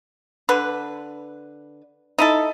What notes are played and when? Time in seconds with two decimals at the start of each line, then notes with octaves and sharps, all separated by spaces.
0.49 D3 B4
2.18 D#4 E4 A4